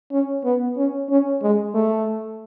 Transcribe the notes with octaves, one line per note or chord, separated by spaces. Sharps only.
C#4
B3
C#4
C#4
G#3
A3